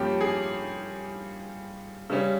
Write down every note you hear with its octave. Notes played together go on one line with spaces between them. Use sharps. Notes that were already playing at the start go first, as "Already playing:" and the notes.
Already playing: G2 F3 A#3 C#4 G4
G#4
C#3 G3 C#4